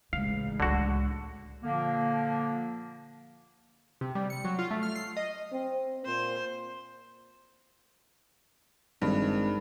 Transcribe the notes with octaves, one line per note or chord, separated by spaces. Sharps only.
A1 C#3 G#3 F5
C#2 D3 G#3 F#4
A#2 D3 F3 A#3
C3
G3
C#7
F#3
F4
A3
F6
C7
D#5
C4
A#2 C5
G#1 G2